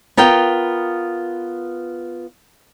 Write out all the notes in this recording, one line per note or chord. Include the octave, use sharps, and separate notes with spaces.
B3 F4 A#4 F5 G5